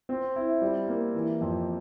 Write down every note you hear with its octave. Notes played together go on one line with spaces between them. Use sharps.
C4
E4
G3
A#3
E3
F2